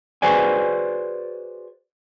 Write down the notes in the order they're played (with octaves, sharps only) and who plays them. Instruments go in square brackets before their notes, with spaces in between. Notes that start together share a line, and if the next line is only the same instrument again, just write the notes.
[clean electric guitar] F#4 G#4 B4 C5 D5 G#5